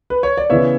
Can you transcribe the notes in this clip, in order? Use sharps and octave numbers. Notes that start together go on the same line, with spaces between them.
B4
C#5
D5
C#3 E3 B3 C#5 E5